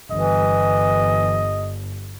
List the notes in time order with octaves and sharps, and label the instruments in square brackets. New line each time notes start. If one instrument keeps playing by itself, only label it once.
[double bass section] G1 [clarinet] E3 [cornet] D#5